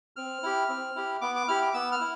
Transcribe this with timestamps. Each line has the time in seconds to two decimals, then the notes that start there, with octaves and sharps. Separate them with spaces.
0.16 C4 F6
0.43 E4 G4
0.69 C4
0.96 E4 G4
1.21 B3 D6
1.36 D6
1.48 E4 G4 F6
1.62 D6
1.74 B3 E6
1.92 F6
2.00 E4